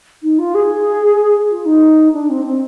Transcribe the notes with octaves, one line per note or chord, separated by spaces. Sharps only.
D#4
F4
G#4
F4
D#4
D4
C4
C4